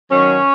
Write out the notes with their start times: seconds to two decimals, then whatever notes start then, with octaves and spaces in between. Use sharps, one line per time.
0.11 F#2 D#3 F#3 C#4